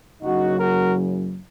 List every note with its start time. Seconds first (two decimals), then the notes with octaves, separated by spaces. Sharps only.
0.22 F#1 F#2 C#3 F#3 D#4 F#4
0.59 F#4 A#4